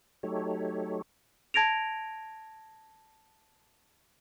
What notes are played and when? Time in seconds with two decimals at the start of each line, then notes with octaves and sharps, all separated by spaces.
0.23 F#3 A3 D#4 G4 A4 C#5
1.54 A5 G#6 A#6 D7 F7